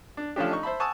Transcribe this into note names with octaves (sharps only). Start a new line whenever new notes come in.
D4
F3 A3 C#4 D4 G4
D#4 C#6
C5 E5 A5 B5
F#5 G#5 A5 C#6 D#6 E6